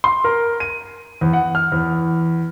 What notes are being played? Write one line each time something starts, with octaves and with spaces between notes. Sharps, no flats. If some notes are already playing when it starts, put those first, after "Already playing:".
C6
A#4
D#7
E2
F#5
F6
E2